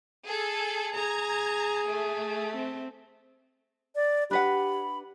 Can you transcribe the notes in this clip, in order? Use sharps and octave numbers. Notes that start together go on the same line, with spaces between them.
G#4 A4
G#4 A#5 G#6
A3
C4
D5
D4 G4 B4 F#5 B5